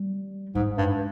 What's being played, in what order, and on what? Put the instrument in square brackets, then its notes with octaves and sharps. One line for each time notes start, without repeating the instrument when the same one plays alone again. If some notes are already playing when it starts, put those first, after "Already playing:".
Already playing: [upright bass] G3
[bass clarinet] G#2 [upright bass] G#3
[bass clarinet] G2